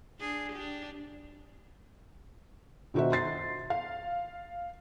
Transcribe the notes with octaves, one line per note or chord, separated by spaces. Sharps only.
D4 G#4
D4 G4
B2 D#3 D#4 F#4 C5 E5
C6 A6 C7
F5